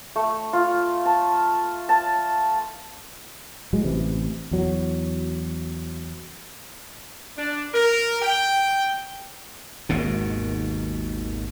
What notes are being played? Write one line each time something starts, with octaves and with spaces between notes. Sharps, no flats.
A3
F4
A5
A5
A2 F#3 G#3
A1 C3 E3
E2 F#3
D4
A#4
G5
G#1 D#2 G#2 B2